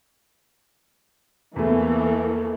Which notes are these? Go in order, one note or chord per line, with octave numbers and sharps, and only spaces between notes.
E2 E3 A3 A#3 A4